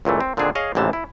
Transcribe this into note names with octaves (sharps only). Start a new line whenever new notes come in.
C#2 A#2 E3 A3
C4
A#2 D3 D#3 C4 D4 G#4
G#4 C#5 D#5 F5
A1 G#2 C3 E3 F3 A5
E4